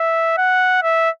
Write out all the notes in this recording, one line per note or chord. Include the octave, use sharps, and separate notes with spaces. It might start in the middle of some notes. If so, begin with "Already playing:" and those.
Already playing: E5
F#5
E5